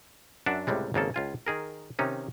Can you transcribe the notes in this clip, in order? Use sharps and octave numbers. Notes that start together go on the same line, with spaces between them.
F#2 D4 E5 F#5
C#2 A2 C3 G3 G#3
G#1 C#3 A#3 A4
C#2 F4 G#5
D#3 G#4 A#4
C3 D#3 C#4 D#4